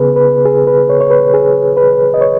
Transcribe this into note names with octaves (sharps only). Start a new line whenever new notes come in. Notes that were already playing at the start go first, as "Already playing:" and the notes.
Already playing: C#3 B3 G#4 B4
B4
G#4
B4
C#5
C#5
B4
G#4
B4
D#5
C#5